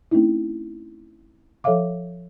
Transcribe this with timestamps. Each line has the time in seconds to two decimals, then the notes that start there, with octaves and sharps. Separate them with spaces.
0.11 A3 C4 C#4 D#4 E4
1.64 F3 A4 C#5 E5 F5 D6